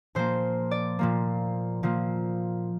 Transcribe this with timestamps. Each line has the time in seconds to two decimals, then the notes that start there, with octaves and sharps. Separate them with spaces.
0.15 A#2 F3 A#3 C5
0.71 D5
0.99 A#2 F3 A#3
1.83 A#2 F3 A#3